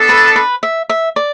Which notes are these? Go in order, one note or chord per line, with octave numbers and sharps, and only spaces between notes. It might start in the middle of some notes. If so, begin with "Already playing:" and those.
Already playing: B3 D4 A4
B4
B4
E5
E5
D5